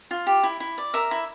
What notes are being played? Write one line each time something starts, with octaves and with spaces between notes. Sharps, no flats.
F4
G4
E4
E4
D5
A#4 E5
E4